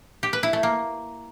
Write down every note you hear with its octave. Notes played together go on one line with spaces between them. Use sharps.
G4
B4
E4
A3
A#3